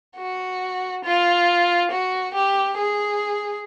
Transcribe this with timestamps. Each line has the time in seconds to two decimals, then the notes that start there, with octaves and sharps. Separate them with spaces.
0.17 F#4
1.05 F4
1.91 F#4
2.34 G4
2.78 G#4